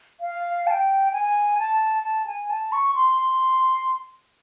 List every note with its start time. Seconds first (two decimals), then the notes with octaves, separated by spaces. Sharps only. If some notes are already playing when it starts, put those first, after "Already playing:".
0.21 F5
0.67 A5
0.71 G5
1.12 G#5
1.59 A5
2.03 A5
2.26 G#5
2.50 A5
2.72 C#6
2.95 C6